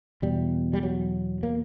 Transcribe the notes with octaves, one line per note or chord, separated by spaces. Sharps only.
E2 B2 G3
G3
F#3
A#3